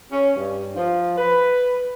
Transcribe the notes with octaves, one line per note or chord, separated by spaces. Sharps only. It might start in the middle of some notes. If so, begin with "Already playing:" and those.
C#4
G2
F3
B4